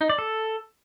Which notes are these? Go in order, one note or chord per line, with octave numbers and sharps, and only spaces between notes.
D#4
D5
A4